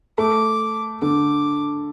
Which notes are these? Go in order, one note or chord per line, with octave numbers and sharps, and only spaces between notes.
A3 D6
D3 D6